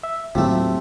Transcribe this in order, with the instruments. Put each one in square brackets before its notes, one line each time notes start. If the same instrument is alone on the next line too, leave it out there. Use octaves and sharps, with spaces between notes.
[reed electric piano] E5
[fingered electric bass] D#2 A2 [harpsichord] C3 A3 [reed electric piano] F#3 F4